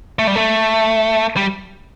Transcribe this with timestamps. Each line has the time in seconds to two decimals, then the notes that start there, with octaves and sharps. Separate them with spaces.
0.19 A3
0.27 G3
0.36 A3
1.36 G3